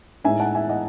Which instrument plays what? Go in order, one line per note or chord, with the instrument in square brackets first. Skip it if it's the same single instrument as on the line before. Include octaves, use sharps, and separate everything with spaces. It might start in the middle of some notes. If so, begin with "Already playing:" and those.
[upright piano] A2 G#3 D#4 E5 G#5
F#5 A5
E5 G#5
D#5 F#5